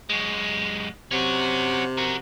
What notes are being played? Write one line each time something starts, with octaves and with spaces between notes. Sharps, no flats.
F#2 G#3
C3 C#4 F#4
F#4 A#4